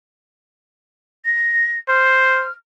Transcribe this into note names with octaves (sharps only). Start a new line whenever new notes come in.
A#6
C5 F6